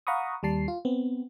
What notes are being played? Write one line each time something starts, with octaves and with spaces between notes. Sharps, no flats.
F5 F#5 A#5 B5 C#6 D#6
D#2 G3 A5 C7
F4
B3 C4